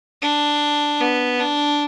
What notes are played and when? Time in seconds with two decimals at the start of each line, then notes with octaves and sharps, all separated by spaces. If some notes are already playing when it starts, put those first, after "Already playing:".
0.22 D4
1.00 B3
1.40 D4